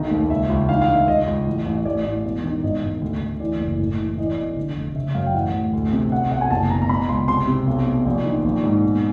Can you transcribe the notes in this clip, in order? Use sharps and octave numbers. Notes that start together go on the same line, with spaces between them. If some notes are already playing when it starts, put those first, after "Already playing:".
Already playing: B1 D#3 D#5
D#2
C#2 E5
C#2
D#3 F5
F5
D#3
E5
C#2 D#5
C#2
A1
A1
A1 D5
A2
E1
D#3
G#1 D#5
G#1
D2
D2
E3 D5
F#1
A2
E3
E3 D#5
D5
B1 D#5
D3
F1
C#3 E5
F#2 F5
G5
A1 F#5
A1
D2
C3
B1 F#5
B1 F#5
G#5
F#1 A5
B2 A#5
A#5
B2 B5
C#2 C6
C3 C6
C3
B1
B2
A#1
D#3
A#1
G#2
B2